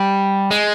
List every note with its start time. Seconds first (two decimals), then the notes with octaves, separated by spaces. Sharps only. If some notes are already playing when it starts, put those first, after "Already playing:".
Already playing: G3
0.51 G#3